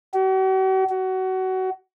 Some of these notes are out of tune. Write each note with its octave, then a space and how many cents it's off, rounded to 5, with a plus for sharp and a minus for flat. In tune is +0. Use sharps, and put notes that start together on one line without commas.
F#4 +45
F#4 +25